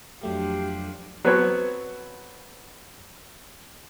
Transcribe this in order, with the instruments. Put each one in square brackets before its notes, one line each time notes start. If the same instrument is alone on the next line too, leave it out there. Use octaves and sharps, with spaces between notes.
[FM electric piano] F2 F#3 A3 [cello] F3 D4 [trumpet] G4
[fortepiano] F#3 B3 C4 A4 B4 C#5